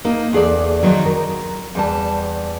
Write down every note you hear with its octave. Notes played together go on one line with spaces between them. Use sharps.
A#3 D#4
E2 G#4 A4 D5
F2 C3 D#3 F#3
A#4
E2 G3 A5